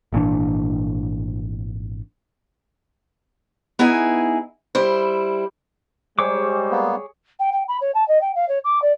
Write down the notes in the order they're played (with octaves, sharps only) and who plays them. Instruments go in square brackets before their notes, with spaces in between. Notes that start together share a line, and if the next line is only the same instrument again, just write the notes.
[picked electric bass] G#1 A#2 E3 D4
[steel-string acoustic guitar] B3 D#4 E4 G#4 G#5
G3 E4 C5
[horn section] G3 G#3 [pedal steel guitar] G#4 C#5 D6 [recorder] C5
[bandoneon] A#3 B3
[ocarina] G5
G5
B5
C#5
A5
D#5
G5
F5
C#5
D6
D5